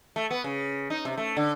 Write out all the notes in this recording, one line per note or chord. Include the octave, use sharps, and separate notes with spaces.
A3
B3
C#3
D#4
C3
A3
D3